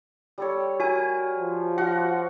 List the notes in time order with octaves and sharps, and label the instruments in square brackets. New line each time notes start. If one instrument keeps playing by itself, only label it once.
[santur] G3 A4 C#5
[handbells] F#4 G#5 [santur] A#4
[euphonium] F3
[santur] F#4 F5 [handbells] F#5